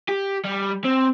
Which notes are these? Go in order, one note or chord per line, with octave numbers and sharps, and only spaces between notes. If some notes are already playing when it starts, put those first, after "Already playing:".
G4
G3
C4